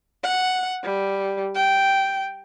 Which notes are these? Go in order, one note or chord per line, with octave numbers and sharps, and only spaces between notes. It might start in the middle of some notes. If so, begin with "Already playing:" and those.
F#5
G3
G5